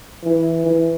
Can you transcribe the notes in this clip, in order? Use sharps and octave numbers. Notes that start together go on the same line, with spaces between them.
E3
E3